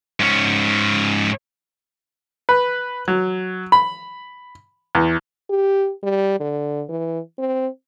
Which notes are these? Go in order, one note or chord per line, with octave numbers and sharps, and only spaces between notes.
G#2 C#4
B4
F#3
B5
E2
G4
G3
D3
E3
C4